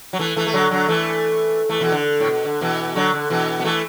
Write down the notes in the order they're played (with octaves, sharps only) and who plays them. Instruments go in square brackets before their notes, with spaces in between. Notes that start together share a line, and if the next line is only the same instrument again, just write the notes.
[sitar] F#3
E3 A3
E3 A3
A3
D3 F#3
D3 F#3
E3 A3
E3 A3
B2 E3
D3
A2
B2
D3
B2 E3
D3 F#3
D3
B2 E3
B3
E3 A3